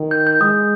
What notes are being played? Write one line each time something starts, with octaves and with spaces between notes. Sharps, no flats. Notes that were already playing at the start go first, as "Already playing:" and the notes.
Already playing: D#3
G6
G6
G#3 D#6